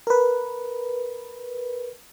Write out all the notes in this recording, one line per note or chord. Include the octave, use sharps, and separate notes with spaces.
A#4 B4